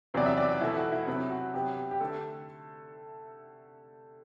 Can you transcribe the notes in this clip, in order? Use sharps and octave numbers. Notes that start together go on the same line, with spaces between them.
E2 C3 F#3 B3 D5
E5
D5
F#4
E2 B2 A3 E4
F#4
E4
C3 F#3 B3 E4
F#4
C3 F#3 B3 G4
G4
G4
D3 A3 A4